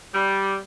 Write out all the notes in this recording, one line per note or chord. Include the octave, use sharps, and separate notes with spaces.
G3